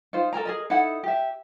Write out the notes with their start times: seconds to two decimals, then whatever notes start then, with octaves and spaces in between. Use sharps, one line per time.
0.13 D#4 F4 C5
0.33 A4 A#4 G#5 A#5
0.45 G#4 A#4 D#5
0.70 D#4 E4 A4 F#5
1.03 G4 E5